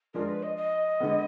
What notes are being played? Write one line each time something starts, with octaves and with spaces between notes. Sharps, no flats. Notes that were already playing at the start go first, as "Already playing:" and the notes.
F3 G#3 D4 F4 A#4
B4
D#5
D#5
D3 G#3 B3